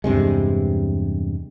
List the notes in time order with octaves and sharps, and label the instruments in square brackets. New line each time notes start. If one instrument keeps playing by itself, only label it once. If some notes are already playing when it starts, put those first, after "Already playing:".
[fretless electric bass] E2 G2 C3 G#3